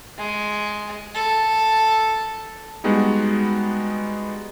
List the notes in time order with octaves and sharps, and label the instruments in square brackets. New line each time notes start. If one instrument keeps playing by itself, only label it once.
[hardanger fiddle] G#3
A4
[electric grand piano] G3 G#3 B3 D#4 F#4 G#4